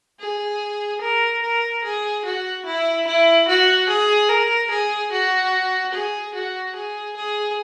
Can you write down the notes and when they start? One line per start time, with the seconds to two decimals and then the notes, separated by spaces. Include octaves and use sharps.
0.20 G#4
1.01 A#4
1.42 A#4
1.84 G#4
2.25 F#4
2.65 E4
3.07 E4
3.48 F#4
3.89 G#4
4.29 A#4
4.70 G#4
5.12 F#4
5.94 G#4
6.34 F#4
6.75 G#4
7.16 G#4